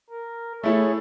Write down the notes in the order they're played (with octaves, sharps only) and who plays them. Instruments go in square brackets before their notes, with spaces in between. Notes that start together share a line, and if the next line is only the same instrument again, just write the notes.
[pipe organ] A#4
[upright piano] A3 E4 A4 [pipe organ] G#4 C#5